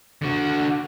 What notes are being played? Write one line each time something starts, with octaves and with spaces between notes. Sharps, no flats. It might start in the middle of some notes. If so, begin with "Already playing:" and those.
D3 F#4